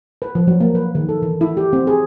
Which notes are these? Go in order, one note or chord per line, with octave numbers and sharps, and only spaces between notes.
B4
F3
F#3
A#3
B4
D#3
A4
E3
E4
G4
C4
G#4